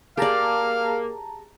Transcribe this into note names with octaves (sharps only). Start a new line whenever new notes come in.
A#3 G4 G#4 D5 F5 A5 A#5